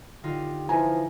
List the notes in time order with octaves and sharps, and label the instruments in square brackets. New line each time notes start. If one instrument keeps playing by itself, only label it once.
[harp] D3 D#4 F4 [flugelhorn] G4
[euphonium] E3 [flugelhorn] F3 [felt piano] G#5 A#5